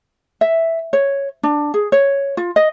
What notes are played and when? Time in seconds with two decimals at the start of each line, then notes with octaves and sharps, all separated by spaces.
0.41 E5
0.93 C#5
1.43 D4
1.74 G#4
1.92 C#5
2.37 F4
2.56 D#5